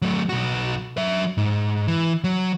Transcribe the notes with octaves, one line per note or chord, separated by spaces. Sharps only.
F#3 A3
B1 F#4
F#3 E5
G#2
E3
F#3